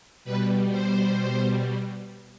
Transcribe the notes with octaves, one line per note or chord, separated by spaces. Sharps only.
B2 G3 B4
C5